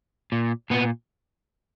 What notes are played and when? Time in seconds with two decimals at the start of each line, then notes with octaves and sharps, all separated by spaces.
0.32 A#2
0.70 A#2 B3